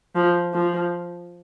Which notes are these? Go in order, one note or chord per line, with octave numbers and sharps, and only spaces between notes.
F3
F3